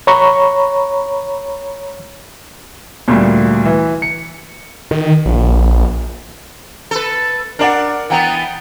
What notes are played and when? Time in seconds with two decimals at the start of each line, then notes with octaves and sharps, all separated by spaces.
0.07 C#5 A#5 B5 C#6
3.08 D2 A#2 G3
3.65 E3
4.02 C#7
4.91 D#3
5.26 A#1
6.91 A4 B4
7.59 D4 A#4 D5 F#5
8.10 E3 B3 F#5 G5 A#5